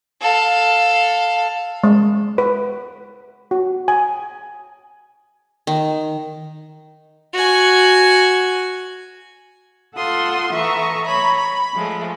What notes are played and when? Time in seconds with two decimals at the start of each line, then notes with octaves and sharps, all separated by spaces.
0.21 A4 F5
1.84 G#3
2.38 B4
3.51 F#4
3.88 G#5
5.67 D#3
7.34 F#4 G#5
9.96 F4 A4 F#5 C6 D#6
10.55 E3 A4 E5 A#5 C#6 D#6
11.05 C#5 A#5 B5
11.37 B5
11.74 F3 G#3 A3